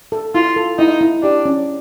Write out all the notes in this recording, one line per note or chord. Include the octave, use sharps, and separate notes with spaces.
A4
E4 F4
A4
D#4 E4
E4
D4 G4
C#4